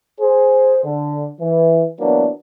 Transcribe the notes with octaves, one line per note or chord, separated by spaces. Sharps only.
G#4 C5
D3
E3
E3 F#3 A#3 B3 D4